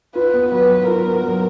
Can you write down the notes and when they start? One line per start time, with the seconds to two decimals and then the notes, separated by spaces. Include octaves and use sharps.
0.15 F4 B4
0.34 B3
0.52 F#3 B4
0.69 F#3
0.88 F4 A#4
1.06 B3
1.23 F#3